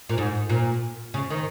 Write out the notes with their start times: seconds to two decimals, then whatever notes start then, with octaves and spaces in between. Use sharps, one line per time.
0.09 A#2
0.18 G#2
0.50 A#2
1.14 C#3
1.30 D#3